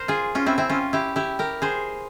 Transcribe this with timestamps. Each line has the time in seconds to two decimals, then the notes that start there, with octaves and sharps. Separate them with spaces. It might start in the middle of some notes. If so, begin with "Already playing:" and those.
Already playing: A#4 C5
0.08 F4 G#4
0.35 C#4 F4
0.46 C4 E4
0.58 C4 E4
0.69 C#4 F4
0.93 E4 G4
1.16 E4 G4
1.39 G4 A#4
1.62 G#4 C5